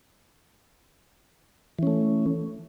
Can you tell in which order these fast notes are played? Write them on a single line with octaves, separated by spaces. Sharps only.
E3 C#4 A3